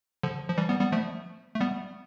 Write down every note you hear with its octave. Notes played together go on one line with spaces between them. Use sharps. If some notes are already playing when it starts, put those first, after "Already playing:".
D3 F3
F3
E3 G3
G3 B3
G3 B3
F3 A3
A3
G3 B3